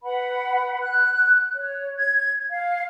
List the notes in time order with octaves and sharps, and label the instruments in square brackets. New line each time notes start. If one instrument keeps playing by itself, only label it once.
[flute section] B4 F#5 B5
F#6
C#5
G#6
F5